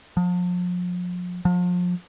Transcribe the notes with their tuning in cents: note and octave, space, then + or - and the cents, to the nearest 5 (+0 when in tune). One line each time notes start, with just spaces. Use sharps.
F3 +40
F3 +35